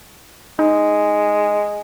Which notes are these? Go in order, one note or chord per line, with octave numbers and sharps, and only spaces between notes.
G#3 D#4